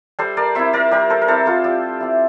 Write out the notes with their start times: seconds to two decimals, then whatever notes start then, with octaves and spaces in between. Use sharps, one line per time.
0.19 G3 A4 C5
0.37 A#4 D5
0.55 C4 E4 C5 E5
0.73 A#4 D5
0.91 G3 G4 A#4
1.10 A4 C5
1.22 A#4
1.28 C4 E4 A4 C5
1.46 F4 A4
1.64 G3 G4
2.01 C4 E4